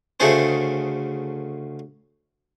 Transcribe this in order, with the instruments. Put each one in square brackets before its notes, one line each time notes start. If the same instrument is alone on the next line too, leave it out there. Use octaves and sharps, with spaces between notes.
[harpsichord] D2 C#3 A3 G#4 A4 C5